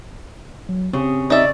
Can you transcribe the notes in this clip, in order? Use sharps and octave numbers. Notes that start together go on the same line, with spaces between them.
F#3
C#3 C4 G4 D#6
D#4 D5 E5